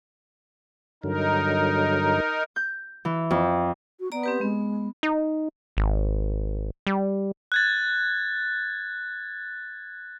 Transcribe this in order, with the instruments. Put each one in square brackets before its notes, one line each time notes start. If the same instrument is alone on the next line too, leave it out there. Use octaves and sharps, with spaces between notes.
[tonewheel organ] G2 D3 F#3 [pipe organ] D#4 A#4
[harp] G6
E3
F2
[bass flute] F#4
[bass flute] B3 [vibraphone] D5 A#5
[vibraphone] C4 G4 B4
[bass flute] G#3 [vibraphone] B3
[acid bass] D#4
G#1
G3
[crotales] F#6 G#6 A6